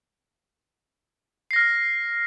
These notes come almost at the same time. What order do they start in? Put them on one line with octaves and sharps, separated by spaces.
C7 A#6 F6